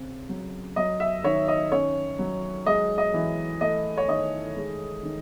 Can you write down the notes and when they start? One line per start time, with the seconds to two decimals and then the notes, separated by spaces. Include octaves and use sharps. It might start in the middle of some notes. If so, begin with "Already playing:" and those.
Already playing: C#3 C4
0.29 F#3
0.76 F#3 D#5
1.00 E5
1.24 D#3 C#5
1.48 D#5
1.71 C#4 C#5
2.19 F#3
2.66 G#3 D#5
2.98 D#5
3.14 E3
3.61 A3 D#5
3.97 C#5
4.08 D#3 D#5
4.56 G#3
5.03 D#3